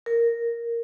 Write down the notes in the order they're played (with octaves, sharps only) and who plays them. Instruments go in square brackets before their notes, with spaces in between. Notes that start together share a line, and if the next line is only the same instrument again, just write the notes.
[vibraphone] A#4